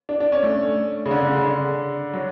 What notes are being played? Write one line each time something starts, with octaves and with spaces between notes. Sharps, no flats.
D4
D4
C#4
A3
C#3
D3
D3
C#3
D3
F#3